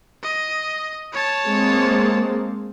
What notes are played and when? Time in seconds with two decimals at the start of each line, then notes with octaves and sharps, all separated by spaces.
0.23 D#5
1.13 C#5 A5
1.47 G#3 A#3 C4